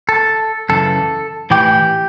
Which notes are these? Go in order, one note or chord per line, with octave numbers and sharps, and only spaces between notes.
A4
F#2 C#3 E3 A4
A2 E3 G4